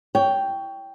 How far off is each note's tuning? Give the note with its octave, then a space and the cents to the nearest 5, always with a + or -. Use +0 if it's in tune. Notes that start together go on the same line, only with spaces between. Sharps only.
C#5 +20 G5 +0